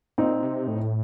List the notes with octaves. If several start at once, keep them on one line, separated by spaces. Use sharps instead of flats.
A#2 C4 D#4
C3
A2